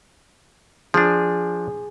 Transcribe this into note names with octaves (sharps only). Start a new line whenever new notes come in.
F3 D4 G#4